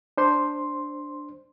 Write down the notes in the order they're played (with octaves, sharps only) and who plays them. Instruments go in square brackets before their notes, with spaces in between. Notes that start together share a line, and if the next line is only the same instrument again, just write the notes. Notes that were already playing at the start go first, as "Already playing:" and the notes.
[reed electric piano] D4 C5 C6